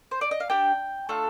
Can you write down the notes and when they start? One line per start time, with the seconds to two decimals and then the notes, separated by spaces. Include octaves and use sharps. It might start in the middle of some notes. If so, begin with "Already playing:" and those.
0.11 C5
0.21 D5
0.31 D#5
0.40 F5
0.50 D4 G4 G5
1.09 A3 D4 F4 A4